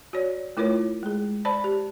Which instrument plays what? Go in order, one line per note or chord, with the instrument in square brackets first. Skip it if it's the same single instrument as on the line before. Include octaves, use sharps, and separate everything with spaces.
[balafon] F#4 C#5 D5
A3 E4 F4 A#4 C#5
G#3 G#4
C5 D5 A5 B5
G4